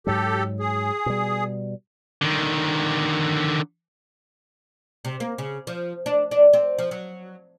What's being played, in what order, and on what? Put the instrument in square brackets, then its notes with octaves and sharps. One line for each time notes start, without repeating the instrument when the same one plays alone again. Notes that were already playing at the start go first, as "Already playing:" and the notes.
[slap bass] G#2 F#3 [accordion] G4 A4
[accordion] G#4
[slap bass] B2 G3
[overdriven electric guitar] D3 D#3
[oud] C3
A#3
C#3
F3
D4
D4
C4
F3
F#3